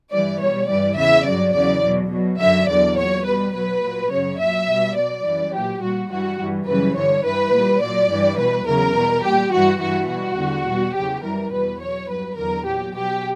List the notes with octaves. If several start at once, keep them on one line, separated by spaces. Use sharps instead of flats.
G2 E3 G3 D5
B2 G3 C#5
G2 E3 G3 D5
E2 C#3 E3 E5
G2 F#3 D5
E2 C#3 F#3 D5
B2 F#3
B2 F#3
F#2 D3 F#3 E5
E2 D3 F#3 D5
A#2 F#3 C#5
B2 G3 B4
B2 F#3 B4
A#2 F#3
F#2 C#3 F#3 C#5
A#2 F#3 E5
B2 G3
B2 F#3 D5
F#2 E3 G3
A#2 F#3 G4
A#2 G3 F#4
G2 E3 G3 F#4
G2 E3 G3
F#2 C#3 E3 G3 B4
G2 D3 G3 C#5
G2 E3 G3 B4
A#2 G3
A#2 F#3 D5
G2 E3 G3
B2 G3 B4
E2 C#3 F#3 A#4
B2 G3
A#2 G3 G4
G2 E3 G3 F#4
G2 E3 G3 F#4
B2 G3 F#4
E2 D3 G3
B2 G3
E2 C#3 F#3 G4
F#2 E3 G3 A#4
E2 B2 G3 B4
B2 F#3 C#5
G2 F#3 B4
E2 D3 F#3 A#4
A#2 F#3 G4
B2 F#3 G4